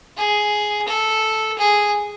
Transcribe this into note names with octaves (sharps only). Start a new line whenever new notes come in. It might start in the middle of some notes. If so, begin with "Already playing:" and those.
G#4
A4
G#4